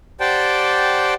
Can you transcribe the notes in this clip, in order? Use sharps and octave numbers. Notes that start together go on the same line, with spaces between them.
G4 C5 D5 F#5 G5 A5